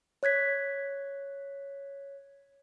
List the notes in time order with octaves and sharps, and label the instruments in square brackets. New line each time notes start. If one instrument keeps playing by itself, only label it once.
[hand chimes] C#5 F#6 G#6 B6